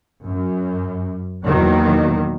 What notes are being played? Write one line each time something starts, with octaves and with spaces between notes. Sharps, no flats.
F#2
E2 B2 D#3 F#3 A#3